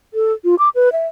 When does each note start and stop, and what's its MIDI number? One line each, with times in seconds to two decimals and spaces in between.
0.14 0.33 69
0.44 0.55 65
0.59 0.69 86
0.75 0.92 71
0.92 1.07 76